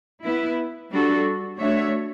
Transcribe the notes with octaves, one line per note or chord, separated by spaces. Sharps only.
B3 E4 B4
G3 D4 F#4 A4
A3 D4 F#4 C#5 E5